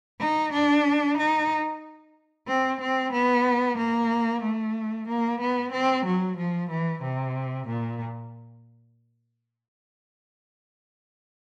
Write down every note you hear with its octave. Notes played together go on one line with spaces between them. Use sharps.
D#4
D4
D#4
C4
C4
B3
A#3
A3
A#3
B3
C4
F#3
F3
E3
C3
A#2